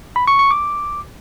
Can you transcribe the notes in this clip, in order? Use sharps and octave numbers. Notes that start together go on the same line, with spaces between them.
B5
C#6
C#6
D6